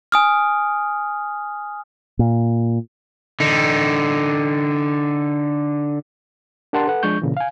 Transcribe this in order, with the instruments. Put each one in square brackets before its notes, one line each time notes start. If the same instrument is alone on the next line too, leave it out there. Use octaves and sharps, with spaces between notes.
[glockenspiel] G#5 D#6 F6
[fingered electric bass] A#2
[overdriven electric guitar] D3 D#4
[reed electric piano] D4 G4 A#4 F#5 A5 C6
A4 B4 F#5
F3 G#3 D4 C#6 G6
A#2 C#3 E3
F5 G#5